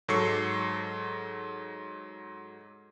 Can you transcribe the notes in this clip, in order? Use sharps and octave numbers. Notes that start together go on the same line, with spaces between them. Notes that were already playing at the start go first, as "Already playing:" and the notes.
G#2 F#3 A4 C#6 C7 C#7